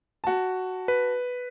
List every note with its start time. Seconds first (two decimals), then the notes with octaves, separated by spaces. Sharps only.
0.24 F#4 A5
0.88 B4